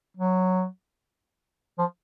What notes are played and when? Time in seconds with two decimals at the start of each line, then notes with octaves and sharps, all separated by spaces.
0.17 F#3
1.78 F3